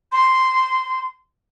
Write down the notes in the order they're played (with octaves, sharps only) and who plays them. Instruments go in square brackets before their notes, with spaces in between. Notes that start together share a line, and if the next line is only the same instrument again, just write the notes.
[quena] C6